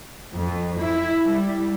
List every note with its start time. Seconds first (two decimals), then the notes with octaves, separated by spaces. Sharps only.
0.33 F2
0.79 E4
1.26 G3